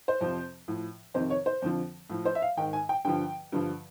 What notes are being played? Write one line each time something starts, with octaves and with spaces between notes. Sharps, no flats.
C5
F2 C3 F3
A2 F3
F2 C3 D#3 C5
C#5
C5
F2 D3 F3
A2 F3
C5
E5
F5
G#2 D#3 G5
G#5
G5
G2 D3 F3 G5
G2 D3 F3